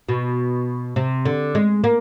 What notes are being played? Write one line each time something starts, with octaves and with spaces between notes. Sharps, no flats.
B2
C3
D3
G#3
A#3